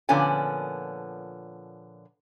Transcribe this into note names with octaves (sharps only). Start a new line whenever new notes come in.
A#2 D3 F3 B3 C#4 G#5